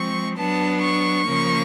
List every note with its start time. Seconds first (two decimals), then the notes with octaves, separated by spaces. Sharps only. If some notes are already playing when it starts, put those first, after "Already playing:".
Already playing: F3 G#3 C4 C#6
0.37 F#3 B3 D4 A5
0.80 C#6
1.25 C#3 F3 A#3